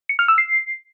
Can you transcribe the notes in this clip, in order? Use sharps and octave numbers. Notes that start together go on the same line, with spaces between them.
C#7
F6
E6
C7